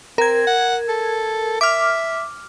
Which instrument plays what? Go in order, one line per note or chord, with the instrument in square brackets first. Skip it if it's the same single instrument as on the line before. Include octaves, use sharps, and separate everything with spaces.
[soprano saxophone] C4 [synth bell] A#4 G#6
[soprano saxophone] F#5
A4
[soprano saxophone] E5 [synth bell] D6 F6